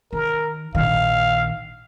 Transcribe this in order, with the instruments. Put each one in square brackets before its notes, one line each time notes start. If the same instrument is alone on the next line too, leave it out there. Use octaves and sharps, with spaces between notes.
[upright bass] D#3 [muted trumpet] A#4
[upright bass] A#1 D#3 [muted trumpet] F5